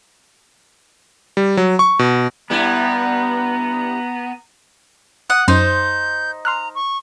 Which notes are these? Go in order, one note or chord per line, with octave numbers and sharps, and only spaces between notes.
G3
F#3
C#6
B2
G2 G3 B3 E4 A#5
F#5 D#6
F#2 D#4 C5 G6
A#5 C6 F6 F#6
C#6